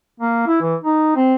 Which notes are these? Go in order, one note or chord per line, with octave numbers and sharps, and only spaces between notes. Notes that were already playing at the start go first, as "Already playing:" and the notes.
A#3
E4
E3
D#4
C4